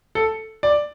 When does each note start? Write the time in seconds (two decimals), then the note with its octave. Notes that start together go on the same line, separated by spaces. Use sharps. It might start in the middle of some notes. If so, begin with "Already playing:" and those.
0.15 A4
0.63 D5